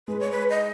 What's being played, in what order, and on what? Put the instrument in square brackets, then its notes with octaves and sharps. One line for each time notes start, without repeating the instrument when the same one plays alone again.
[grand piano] G#3 [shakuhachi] B4
[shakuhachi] C#5
B4
D#5